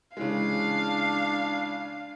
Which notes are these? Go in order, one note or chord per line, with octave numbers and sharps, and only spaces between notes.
C#3 E3 G#3 D4 F5